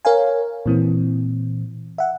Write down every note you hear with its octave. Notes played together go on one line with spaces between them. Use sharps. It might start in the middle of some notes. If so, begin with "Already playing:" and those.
A#4 C#5 F5 G#5
A#2 E3 C4
E5 F#5